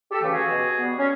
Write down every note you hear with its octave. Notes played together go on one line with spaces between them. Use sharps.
G4 A4
C#3 E3 A3
F#4 G#4
B2
G3 B3
C#4